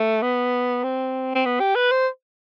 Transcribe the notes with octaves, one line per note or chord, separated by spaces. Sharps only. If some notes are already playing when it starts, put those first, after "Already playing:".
Already playing: A3
B3
C4
C4
B3
G4
B4
C5